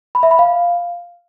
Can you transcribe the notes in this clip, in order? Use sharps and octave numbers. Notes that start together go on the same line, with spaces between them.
B5
E5
B5
F5